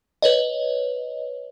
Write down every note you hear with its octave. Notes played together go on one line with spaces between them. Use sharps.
B4 C#5 D#5